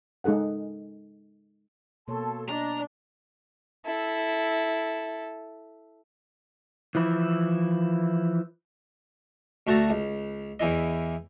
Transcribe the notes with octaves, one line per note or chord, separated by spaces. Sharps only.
G#3 D#4 G#4 A4 F#5
B2 A#3 A4 C#5 A5 C6
D4 D5 D#5 A#5
E4 A4
E3 F3 E4
D2 A3 F#4 A4 A#5
C#2
E2 E3 E4 D#5